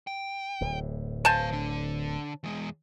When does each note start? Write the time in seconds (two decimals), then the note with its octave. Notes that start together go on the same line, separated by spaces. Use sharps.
0.07 G5
0.61 D1 A2
1.25 B4 C5 F5 G#5 A5
1.51 D3 D4
2.44 E2 G#3